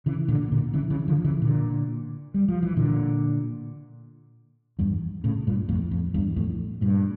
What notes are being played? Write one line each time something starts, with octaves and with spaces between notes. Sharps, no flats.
C#3 E3
A#2 D3
A#2 D3
C#3 E3
C#3 E3
D3 F3
C#3 E3
A#2 D3
G3
F3
E3
A#2 D3
E2 G2
A2 C#3
G2 A#2
F2 A2
F2
E2 G2
F2 A2
G2 A#2